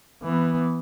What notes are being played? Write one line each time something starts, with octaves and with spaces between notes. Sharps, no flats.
E3 B3